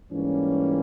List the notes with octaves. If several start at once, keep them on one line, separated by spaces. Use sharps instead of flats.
G#2 E3 G3 A#3 C#4